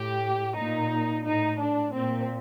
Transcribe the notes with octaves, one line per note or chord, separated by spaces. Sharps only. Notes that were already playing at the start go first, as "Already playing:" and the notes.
Already playing: A2 G4
A#2 D#4
A2 D#4
D4
A#2 C4